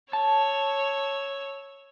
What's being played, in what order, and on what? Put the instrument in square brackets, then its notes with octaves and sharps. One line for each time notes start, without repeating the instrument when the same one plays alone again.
[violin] C#5 E6 [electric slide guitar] A5